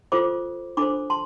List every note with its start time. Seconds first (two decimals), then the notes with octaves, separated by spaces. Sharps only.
0.12 F4 A4 C5 B5 D6
0.77 D4 A4 C5 B5 D6
1.10 A5 C6